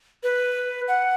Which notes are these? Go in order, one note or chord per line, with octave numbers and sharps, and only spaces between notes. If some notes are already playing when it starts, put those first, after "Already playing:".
B4
F#5